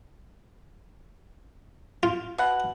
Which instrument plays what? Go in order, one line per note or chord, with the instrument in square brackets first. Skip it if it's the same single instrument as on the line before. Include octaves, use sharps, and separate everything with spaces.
[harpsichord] F4
[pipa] B2 F#5